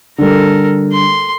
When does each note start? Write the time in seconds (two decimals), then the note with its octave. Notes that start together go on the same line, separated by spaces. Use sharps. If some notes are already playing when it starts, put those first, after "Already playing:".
0.18 D3 G3 A4 A#4
0.92 C6